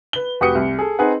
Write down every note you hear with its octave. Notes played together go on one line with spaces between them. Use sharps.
B4 G7
F1 F#4 G4 B4 D#6 C#7
C2
G#4 A4
C4 D#4 G#4 B4 F#5